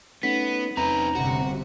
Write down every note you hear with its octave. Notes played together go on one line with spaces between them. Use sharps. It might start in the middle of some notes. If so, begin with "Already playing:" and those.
A3 B3 C#4 D#4 B6
E2 C4 C#4 D#4 B4 A#5
G1 C3 F#4